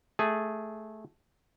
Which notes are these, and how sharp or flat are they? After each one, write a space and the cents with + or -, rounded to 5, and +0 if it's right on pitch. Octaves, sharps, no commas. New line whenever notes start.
A3 -10 G#4 +0